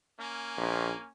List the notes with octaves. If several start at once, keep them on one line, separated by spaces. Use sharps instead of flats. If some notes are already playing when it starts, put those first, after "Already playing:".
A#3 C#4 G#5
A#1